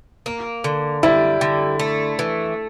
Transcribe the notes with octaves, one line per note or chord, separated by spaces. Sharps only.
A#3
D3
G3 E4
D3
A3
E3